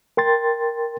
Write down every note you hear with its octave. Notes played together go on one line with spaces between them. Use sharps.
A#4 G5 C6 A6